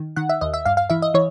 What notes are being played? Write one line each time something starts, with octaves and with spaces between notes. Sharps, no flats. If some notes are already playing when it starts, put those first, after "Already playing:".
Already playing: D#3
D#3 F#5
E5
D#2 D#5
E5
G2 F5
F5
E3 E5
D#5
E3 C#5